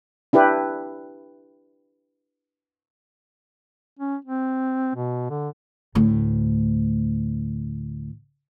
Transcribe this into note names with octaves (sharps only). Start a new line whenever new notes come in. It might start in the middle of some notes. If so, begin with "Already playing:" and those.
D4 E4 G4 B4
C#4
C4
B2
D3
D2 A2